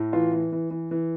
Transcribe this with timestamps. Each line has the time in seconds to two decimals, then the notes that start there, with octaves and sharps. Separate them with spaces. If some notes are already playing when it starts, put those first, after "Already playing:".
Already playing: A2
0.13 E3 F4
0.33 E3
0.52 E3
0.71 E3
0.91 E3